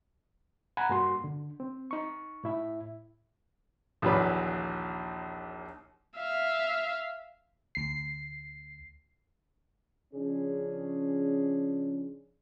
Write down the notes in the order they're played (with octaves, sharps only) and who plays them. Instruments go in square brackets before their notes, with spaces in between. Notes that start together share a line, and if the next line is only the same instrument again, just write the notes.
[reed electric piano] F#5 G#5 A#5 B5
G2 A#3 F#4 C6
D3
C4
D#4 C#6
A2 E4 E5
[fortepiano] A#1 D#2 E3 F#3 B4 D5
[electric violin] E5 F5
[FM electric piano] D2 C7
[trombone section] C#3 F3 C#4 D4 G#4